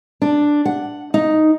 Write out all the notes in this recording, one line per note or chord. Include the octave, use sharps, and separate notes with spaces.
D4
F#5
D#4